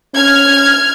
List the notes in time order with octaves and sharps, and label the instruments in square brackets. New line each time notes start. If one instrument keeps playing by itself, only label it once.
[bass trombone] C#4 [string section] F6 G#6